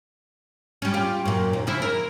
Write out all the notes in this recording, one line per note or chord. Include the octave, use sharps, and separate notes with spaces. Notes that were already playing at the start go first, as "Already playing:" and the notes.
G3 C#4
F4 G4
F#2 A#2
D#2
C#3 F3 E4
A#4